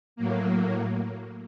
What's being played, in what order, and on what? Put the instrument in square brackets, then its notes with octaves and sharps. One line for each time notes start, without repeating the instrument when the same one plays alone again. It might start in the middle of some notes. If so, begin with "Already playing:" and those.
[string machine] A2 F#3 A#3